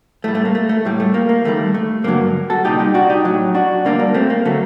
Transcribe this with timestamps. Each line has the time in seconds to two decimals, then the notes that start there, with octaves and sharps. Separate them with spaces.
0.24 A2 G3 A3
0.35 A3
0.45 A#3
0.55 A3
0.69 A3
0.85 A2 G3
1.00 A3
1.14 A#3
1.29 A#3
1.44 D#2 D#3 G3 A3
1.74 A3
2.04 G2 D3 F#3 A#3
2.50 F#4 A4
2.64 C2 A#2 G3 D#4 G4
2.79 D#4 G4
2.94 D4 F#4
3.10 D#4 G4
3.25 A2 F#3
3.55 D4 F#4
3.85 D2 D3 G3 A#3 D4
3.99 A#3
4.14 A3 C4
4.30 A#3
4.45 D3 F#3 A3